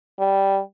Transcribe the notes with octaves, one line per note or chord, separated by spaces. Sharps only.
G3